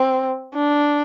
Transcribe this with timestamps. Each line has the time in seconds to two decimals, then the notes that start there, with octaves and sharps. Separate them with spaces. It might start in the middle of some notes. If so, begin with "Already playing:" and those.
Already playing: C4
0.54 D4